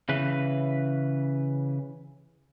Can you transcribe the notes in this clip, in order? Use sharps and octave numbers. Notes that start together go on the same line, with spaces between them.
C#3 E3 B4